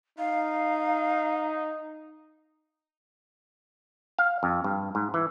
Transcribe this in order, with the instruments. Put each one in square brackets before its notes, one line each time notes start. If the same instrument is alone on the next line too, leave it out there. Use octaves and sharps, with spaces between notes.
[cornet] D#4 [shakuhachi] F5
[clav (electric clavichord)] F5
F2
G2
G#2
E3